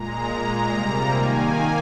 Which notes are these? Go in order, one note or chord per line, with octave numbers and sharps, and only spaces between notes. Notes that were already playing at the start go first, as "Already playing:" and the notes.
Already playing: A#2 G#3 A#5
A#2 G#3 A#5
C3 G3 A#3
D#3 A#3 G#5